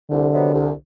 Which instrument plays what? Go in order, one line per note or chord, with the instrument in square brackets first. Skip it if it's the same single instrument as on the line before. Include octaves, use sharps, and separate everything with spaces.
[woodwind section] C2 [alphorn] D3
[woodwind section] C3 D#3 F#3 B3
C2